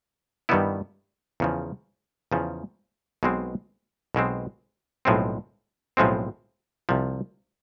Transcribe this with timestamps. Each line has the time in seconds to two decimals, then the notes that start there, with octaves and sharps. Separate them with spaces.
0.49 G2 D#3 G3 B3 E4
1.40 E2 C#3 F3
2.32 E2 C#3 F3
3.23 B1 B2 G#3 C4
4.15 B1 B2 G#3 C4
5.05 B1 A2 F3 G#3 C4
5.97 B1 A2 F3 G#3 C4
6.89 C2 C3 F3